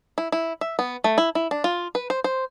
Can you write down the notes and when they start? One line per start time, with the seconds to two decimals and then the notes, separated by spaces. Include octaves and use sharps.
0.18 E4
0.32 E4
0.61 E5
0.79 B3
1.04 A3
1.18 E4
1.35 E4
1.51 D4
1.64 F4
1.95 B4
2.10 C5
2.24 C5